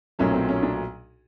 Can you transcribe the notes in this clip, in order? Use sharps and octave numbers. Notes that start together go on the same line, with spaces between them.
B1 A#2 F#3 A3 C#4
C4
C#4
D4